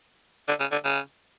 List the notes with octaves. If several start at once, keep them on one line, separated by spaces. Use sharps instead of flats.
D3
C#3
D3
C#3